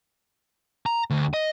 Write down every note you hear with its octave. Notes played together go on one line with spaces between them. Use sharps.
A#5
D2
D#5